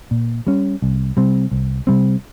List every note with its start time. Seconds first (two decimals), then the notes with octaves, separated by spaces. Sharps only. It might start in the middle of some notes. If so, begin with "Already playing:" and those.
0.11 A#2
0.47 G3 C#4
0.82 C2
1.17 C3 G3 C4
1.52 C2
1.87 C3 G3 C4